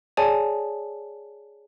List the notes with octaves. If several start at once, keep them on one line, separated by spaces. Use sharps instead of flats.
G#4 C#5 D5 G#5 A5